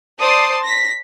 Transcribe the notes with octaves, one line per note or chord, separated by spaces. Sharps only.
C5 D5 A5 C6 D#6 C7
A#6 B6